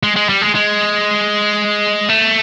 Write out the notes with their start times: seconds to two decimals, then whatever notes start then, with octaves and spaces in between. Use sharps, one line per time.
0.03 G#3
0.16 G#3
0.29 G3
0.42 G#3
0.55 G#3
2.09 A3